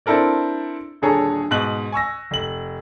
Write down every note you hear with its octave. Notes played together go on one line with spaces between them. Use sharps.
C4 D4 E4 A4 A#4 D5
D#1 D3 G#4 A4 C#5 A#5
G#2 B2 F#6 F#7
G#5 C#6 E6 A#6
F1 F#7